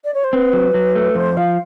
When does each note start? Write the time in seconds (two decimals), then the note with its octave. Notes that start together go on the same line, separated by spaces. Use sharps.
0.04 D5
0.13 C#5
0.23 C5
0.33 C4 B4
0.53 F#3
0.74 F#3
0.95 A3
1.15 F2 C5
1.36 F3 F5